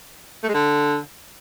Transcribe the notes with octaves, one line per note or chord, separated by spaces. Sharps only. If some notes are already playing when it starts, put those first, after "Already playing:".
A3
G#3
D3